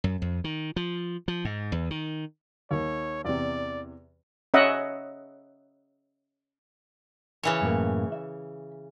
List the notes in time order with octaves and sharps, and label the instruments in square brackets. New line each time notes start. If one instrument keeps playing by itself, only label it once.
[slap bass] F#2
F2
D#3
F3
F3
G#2
E2
D#3
[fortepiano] D#2 [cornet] C#5
[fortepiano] E2 C3 [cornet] D5
[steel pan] C#4 D#5 E5 F#5
[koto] C#3 E3 C#5
[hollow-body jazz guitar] F#2 A2 A#3
E5